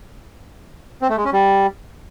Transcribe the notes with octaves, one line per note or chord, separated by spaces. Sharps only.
C4
A3
G#3
C#4
G3